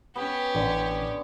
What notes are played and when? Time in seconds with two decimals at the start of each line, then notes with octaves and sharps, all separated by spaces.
0.16 B3 C#4 G4
0.55 A1 D3